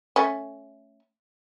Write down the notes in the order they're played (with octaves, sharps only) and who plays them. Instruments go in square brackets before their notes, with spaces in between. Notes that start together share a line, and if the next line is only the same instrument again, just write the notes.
[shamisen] A3 C#4